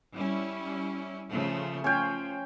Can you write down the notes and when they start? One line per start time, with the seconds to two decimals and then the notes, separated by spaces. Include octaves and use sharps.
0.14 G3 C#4 E4
1.31 C#3 F3 A3
1.84 F3 C#4 G5